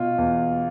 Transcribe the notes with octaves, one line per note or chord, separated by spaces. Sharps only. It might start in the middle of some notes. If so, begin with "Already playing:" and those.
Already playing: B2 F4
E2